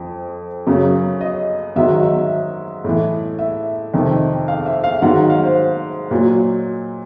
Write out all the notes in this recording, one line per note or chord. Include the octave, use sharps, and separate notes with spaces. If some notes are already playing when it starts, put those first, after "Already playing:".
Already playing: F2 F3
F#2 C#3 F#3
D#5
G#2 D#3 F#3 E5
E5
A2 E3
E5
F2 C3 D#3
F5
E5
F5
G#2 D#3 F#3 F#5
F5
C5
A#2 F#3